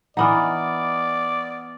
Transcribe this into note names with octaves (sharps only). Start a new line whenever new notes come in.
E3 B3 D#4 D5 F#5 D#6 F6